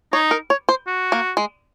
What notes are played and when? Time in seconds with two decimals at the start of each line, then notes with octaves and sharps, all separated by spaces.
0.13 D#4 C#5
0.31 A#4
0.50 C#5
0.69 C5
0.87 F#4
1.12 A#3
1.37 G#3